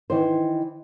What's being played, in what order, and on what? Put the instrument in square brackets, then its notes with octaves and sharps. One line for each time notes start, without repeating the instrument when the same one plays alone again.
[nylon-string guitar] D#3 E3 C5